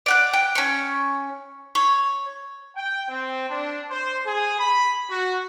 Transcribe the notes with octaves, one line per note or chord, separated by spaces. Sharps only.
D5 F#5 F#6
G5
C#4 C#6
C#5
G5
C4
D4
C5
G#4
B5
F#4